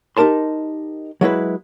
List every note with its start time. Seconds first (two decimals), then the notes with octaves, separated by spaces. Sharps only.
0.17 D#4 G4 A#4 A5 C6
1.21 F#3 G#3 E4 B4